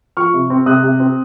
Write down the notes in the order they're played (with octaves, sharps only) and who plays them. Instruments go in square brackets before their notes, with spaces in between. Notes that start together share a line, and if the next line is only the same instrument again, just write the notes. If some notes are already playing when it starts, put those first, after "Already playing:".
[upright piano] F3 C#6 F6
C3
C4
C3 D#6 F#6
C3
C4